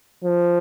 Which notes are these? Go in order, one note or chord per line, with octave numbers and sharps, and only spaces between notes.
F3